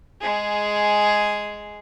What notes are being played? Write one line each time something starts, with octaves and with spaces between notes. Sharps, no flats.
G#3 G#4